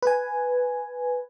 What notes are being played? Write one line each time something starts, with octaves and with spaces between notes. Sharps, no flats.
B4 G#5